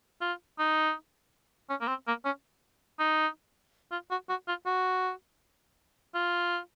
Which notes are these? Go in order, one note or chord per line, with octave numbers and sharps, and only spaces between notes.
F4
D#4
C#4
A#3
C4
A#3
C#4
D#4
F4
F#4
F#4
F4
F#4
F4